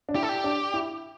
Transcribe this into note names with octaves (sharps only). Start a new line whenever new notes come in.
D4
E4 G4
A4
G4
D4
E4